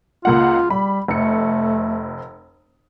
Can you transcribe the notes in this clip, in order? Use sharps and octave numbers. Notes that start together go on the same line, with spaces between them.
C#2 A#3 F4 F#5
G3 B5
F1 A3 C#7